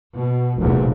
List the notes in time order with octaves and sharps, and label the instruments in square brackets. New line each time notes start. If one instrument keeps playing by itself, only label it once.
[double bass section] B2
F1 B1 E2 A#2